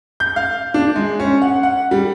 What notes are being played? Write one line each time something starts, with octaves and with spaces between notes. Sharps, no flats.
G6
F5
D4
G#3
C#4
F#5
F#5
G3